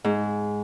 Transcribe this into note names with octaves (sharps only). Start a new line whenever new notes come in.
G#2